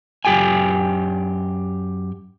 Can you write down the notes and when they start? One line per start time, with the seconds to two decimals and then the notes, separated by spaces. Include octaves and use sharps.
0.25 F#2 B2 G4 G5 G#5